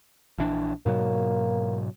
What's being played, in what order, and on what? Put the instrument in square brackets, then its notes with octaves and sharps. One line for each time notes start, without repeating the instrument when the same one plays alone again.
[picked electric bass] A#1 E3 D4
[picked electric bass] G#2 B2 F#3 [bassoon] A#3